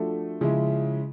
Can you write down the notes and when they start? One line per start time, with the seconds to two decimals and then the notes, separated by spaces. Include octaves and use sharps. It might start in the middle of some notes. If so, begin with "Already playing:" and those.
Already playing: F3 A3 D4 F#4 A4
0.41 C#3 F3 G#3 C#4 E4